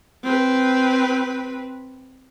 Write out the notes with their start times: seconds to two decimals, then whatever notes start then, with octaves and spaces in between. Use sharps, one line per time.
0.23 C4 B4